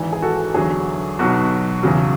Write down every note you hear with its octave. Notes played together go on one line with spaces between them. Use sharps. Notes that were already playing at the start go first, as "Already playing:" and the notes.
Already playing: G#1 G#2 E3
G#4
F#4 A4
E2 D3 F#3 G#4
B1 B2 F#3 F#4
E2 C#3 F#3